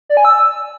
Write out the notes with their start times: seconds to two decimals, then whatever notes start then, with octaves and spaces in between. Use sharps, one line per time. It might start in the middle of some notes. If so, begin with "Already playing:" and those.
0.09 D5
0.17 G#5
0.25 E6